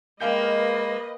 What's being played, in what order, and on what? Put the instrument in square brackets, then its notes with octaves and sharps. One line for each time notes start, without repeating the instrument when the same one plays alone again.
[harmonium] G#3 [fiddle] A#3 [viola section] B4 D#5 [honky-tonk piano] F5 G5 G6